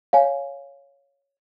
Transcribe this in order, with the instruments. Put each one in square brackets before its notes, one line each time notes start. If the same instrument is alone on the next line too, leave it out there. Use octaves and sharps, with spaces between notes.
[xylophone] C#5 F5 G#5